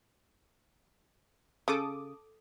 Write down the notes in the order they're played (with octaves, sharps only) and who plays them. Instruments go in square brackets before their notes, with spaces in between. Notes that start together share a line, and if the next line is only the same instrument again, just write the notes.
[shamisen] C#3 [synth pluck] A4 D6 D#6